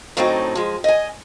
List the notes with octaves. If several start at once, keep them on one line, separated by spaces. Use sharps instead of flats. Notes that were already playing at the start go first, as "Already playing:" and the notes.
F#2 A2 F#3 C4 D4 D#4
F3 G#3
D#5 G#5